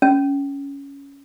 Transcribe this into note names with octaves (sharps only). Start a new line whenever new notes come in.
C#4